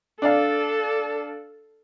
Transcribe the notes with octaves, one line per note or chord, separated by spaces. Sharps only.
D4 A4 D5 F5